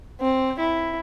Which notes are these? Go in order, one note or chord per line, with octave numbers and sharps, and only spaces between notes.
C4
E4